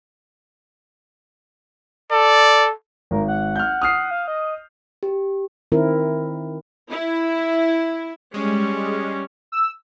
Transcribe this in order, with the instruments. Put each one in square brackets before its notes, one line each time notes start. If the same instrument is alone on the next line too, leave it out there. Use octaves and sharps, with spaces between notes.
[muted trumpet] A4 [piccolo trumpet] D5
[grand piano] G#1 [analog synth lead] A#4
[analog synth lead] F#5
[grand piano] F6 G6
D#6 F6 C7
[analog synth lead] F5
D#5
[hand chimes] G4
[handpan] D#3 C4 E4 A#4
[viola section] E4
[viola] G3 C#4 [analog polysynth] G#3
[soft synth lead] E6